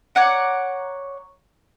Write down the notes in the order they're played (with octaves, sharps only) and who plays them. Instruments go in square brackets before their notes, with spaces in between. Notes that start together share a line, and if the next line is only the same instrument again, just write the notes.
[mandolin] C#5 D5 F#5 A#5